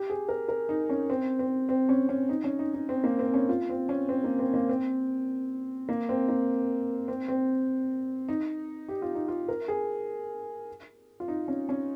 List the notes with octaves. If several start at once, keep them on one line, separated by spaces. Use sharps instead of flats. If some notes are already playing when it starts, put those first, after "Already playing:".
Already playing: G4
G#4
A#4
A#4
D#4
C#4
C4
C4
C4
C#4
C#4
D#4
C#4
D#4
D#4
C4
A#3
C4
C#4
F4
C4
C#4
C4
A#3
C4
A#3
C4
A#3
C4
A#3
C4
C4
D#4
G4
F4
D#4
F4
A#4
G#4
F4
D#4
C#4
C#4